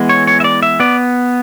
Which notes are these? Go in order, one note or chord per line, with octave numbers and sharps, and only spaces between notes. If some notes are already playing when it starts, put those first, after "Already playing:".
Already playing: E3 G#3 B3
C#5
C#5
E5
D5
E5
B3 D5